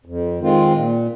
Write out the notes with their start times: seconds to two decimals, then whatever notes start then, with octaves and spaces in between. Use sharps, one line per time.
0.06 F2
0.39 D#3 G#3 C4 F4
0.74 A#2